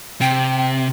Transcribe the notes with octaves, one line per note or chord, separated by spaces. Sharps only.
C3 G5